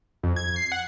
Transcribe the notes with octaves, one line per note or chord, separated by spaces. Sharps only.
F2
G#6
C7
F#5